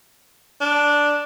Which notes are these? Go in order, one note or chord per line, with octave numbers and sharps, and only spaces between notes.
D4